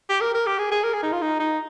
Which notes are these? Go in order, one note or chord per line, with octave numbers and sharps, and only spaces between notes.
G4
A#4
A#4
G4
G#4
G#4
A#4
G#4
D#4
F4
D#4
D#4